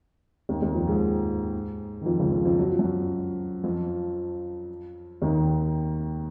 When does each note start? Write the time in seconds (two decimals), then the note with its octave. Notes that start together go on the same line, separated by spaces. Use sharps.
0.49 D#2 D#3
0.61 D#2 D#3
0.74 F2 F3
0.87 G#2 G#3
2.01 D#3
2.05 F2 F3
2.19 C#2 C#3
2.32 F2 F3
2.45 F2 F3
2.59 F#3
2.69 F3
2.79 F#2 F#3
3.64 F2 F3
5.22 D#2 D#3